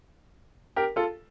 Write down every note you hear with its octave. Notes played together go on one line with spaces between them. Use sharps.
G4 A#4
F4 A4